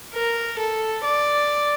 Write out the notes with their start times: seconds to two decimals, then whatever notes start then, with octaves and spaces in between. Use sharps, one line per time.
0.14 A#4
0.59 A4
1.04 D5